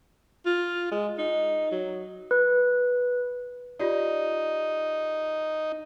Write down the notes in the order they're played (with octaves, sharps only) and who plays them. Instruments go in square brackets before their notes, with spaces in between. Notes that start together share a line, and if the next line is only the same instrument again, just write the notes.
[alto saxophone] F4
G#3
D#4
F#3
[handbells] B4
[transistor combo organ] D#4 [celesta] F4 G4 D5